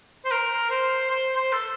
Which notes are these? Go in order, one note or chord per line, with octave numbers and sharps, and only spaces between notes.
C5
A#4
C5
C5
C5
A4